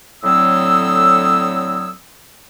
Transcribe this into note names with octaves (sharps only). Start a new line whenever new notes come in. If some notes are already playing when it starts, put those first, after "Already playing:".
A2 D3 F#3 C4 D#6 E6